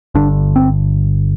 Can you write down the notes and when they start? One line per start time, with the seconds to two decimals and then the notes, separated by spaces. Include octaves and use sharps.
0.15 G1 G2 D3 D4
0.56 C4